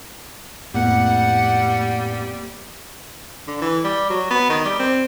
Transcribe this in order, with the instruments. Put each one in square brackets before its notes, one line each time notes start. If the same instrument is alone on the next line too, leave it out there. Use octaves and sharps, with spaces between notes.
[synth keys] F2 A#3 B3 [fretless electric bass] A2 [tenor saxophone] G3 [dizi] F#5
[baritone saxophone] D3
E3
G3
F#3
B3
D#3
G3
C4